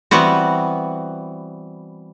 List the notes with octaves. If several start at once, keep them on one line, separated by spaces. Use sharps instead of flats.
E3 G3 B3 C4 F#4